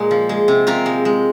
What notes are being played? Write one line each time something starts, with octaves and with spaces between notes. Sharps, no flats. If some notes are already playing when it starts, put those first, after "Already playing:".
Already playing: A#2 G#3 A#4
F3
G#3
C3
C3 F4 A#4
G#3
G#3